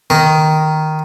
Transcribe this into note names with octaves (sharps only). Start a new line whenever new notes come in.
D#3